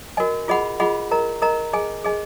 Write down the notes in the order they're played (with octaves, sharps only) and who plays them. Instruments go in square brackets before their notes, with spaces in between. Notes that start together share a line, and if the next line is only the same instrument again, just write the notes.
[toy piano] F#4 A#4 D#5 G#5
F4 G#4 D#5 F#5 B5
F4 G#4 D#5 F#5 B5
A#4 D#5 A#5
A#4 D#5 A#5
G#4 D#5 G#5
G#4 D#5 G#5